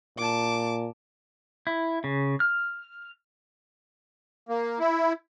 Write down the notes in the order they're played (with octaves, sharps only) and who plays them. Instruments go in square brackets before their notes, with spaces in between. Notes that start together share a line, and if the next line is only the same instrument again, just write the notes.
[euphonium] A#2 [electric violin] A5 D6
[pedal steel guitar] E4
C#3
F6
[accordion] A#3
E4